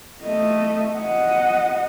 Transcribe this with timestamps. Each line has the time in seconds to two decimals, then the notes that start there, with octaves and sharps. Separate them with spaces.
0.22 A3 D#5
0.98 D#5 F#5